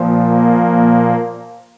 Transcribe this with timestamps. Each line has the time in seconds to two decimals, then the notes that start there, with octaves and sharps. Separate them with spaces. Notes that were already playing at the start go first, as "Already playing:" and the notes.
Already playing: A#2 F3
0.10 A#3